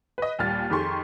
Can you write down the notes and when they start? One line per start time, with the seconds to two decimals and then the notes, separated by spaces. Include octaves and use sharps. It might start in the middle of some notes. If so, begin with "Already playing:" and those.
0.18 B4 D#5
0.39 D#2 A#2 G3 F6 A6
0.70 F2 D#3 G4 G#4 C6 C#6